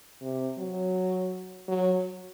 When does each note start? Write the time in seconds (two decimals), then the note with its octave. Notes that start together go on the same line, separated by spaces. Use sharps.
0.21 C3
0.58 F#3
1.68 F#3